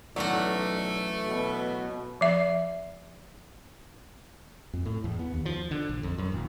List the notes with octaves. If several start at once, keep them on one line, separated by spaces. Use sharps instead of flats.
B1 E3 F#3 A3 C#4 F#4 D5
B2
F3 E5
F2
A2
E2
B3
D#2
F3
D3
A#1
F2
F#2
D#1